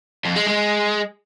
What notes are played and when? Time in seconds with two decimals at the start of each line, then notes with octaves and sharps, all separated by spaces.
0.25 F2
0.36 G#3
0.47 G#3